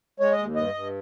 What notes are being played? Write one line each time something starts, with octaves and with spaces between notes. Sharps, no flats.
G#3 C#5
D#5
D#2
G2 D#5
G2